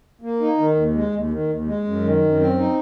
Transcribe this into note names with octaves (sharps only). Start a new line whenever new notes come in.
A#3
D#4
D#3
D#2
G#3
D#2
D#3
D#2
G#3
F#2
D#3
F#2
C4
D#4